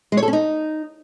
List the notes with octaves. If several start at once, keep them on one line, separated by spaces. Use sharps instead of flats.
G#3
C#5
A4
C#4
D#4